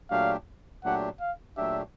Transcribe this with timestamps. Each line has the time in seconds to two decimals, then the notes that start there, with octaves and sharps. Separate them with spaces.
0.10 A#2 F#3 A3 D4 G4 F5
0.84 A#2 F#3 A3 D4 G4 F#5
1.20 F5
1.57 A#2 F#3 A3 D4 G4 E5